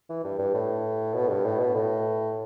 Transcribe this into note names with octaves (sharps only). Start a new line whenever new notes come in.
E3
G2
G2
A2
B2
G2
A2
B2
A2